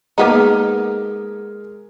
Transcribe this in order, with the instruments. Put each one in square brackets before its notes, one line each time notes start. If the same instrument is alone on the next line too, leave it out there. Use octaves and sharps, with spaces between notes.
[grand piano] G#3 G#4 A#4 [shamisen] A#3 B3 D#4